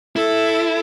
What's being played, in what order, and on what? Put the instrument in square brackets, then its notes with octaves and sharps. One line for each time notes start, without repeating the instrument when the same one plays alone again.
[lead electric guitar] E4 [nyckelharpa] A4